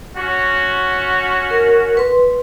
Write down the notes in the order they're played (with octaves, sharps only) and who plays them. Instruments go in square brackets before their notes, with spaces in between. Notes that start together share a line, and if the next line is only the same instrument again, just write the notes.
[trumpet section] C#4 F#4
[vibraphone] A#4
B4 C6